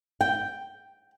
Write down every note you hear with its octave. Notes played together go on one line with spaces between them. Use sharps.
G5